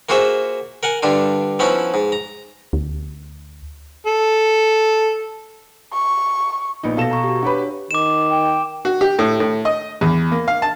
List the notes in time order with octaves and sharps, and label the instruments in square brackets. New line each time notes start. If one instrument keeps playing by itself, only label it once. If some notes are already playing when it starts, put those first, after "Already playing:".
[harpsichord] A#3 F4 F#4 G#4 C5 E5
A#4 F#5 G#5
G2 D3 D4 F4
F3 B3 C#4 D#4 E4
G#2
A#5
[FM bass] D2
[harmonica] A4
[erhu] C#6
[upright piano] A#1 B3 D#4
[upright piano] B2 A4 E7 [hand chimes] F5 A#6
[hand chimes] A#5 C#6
F#4 G4
[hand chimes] D4 C#5 [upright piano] F#4 G4 B4
[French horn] D#3 [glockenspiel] D6 E7
[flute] G5
[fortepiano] F#4
G4
A2
A2
D#5
E2
A#3
F5
A5